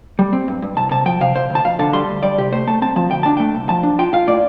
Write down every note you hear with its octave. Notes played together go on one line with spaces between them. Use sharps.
G3
C4
G2
G2
C2 A5
C3 A5
F3 G5
C3 F5
C3 C5
D2
A5
F2 F5
D3 A5
G3 C6
D2
G3 D5
C3 G4
A3 C5
A3 A5
C4 A5
F3 A5
D2 G5
D4 A5
A3 G5
C2
F3 A5
D4
F4 G5
F4 F5
A2 D5